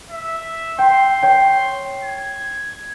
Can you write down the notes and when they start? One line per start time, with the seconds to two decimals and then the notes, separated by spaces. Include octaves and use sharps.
0.10 E5
0.79 G5 C6
1.22 C#5 G5
2.04 G#6